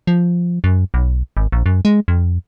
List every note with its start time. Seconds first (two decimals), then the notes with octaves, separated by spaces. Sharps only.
0.07 F3
0.64 F#2
0.94 B1
1.37 G#1
1.52 A#1
1.66 F#2
1.85 G#3
2.08 F2